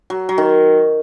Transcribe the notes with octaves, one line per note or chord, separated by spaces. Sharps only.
F#3
F#3
D#3